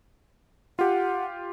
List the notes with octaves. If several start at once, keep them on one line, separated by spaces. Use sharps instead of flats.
F4 G4 F#5